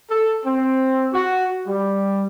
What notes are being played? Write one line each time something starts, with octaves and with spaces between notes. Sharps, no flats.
A4
C4
F#4
G3